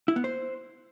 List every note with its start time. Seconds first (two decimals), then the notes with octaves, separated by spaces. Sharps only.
0.08 E4
0.16 B3
0.24 C5